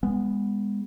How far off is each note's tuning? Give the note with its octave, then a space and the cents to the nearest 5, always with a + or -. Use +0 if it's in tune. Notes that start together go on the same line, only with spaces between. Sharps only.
G#3 -30 B3 +0